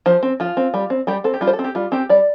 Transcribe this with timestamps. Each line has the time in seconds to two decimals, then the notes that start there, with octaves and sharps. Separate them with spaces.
0.06 F3 C5
0.23 C4
0.40 F3 F4
0.57 C4
0.74 G3
0.90 C4
1.07 G3 G4
1.24 C4 A4
1.34 G4
1.41 G3 F4
1.47 C5
1.53 A4
1.59 C4
1.64 G4
1.75 G3 F4
1.92 C4 G4
2.09 G3 D5